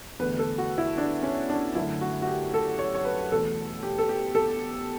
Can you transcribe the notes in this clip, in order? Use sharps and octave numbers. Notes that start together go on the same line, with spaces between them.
E2 D3 A3 B4
A4
F#4
E4
D4
C#4
D4
F#2 D3 A3 E4
F#4
F#4
G4
A4
C#5
C#5
B4
E2 B2 A3 A4
G4
A4
G4
A4